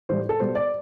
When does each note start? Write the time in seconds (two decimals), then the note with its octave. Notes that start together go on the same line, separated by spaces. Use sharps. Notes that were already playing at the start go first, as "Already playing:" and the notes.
0.09 A2 E3 G3 C5
0.29 A4
0.40 B2 G3 C5
0.55 D5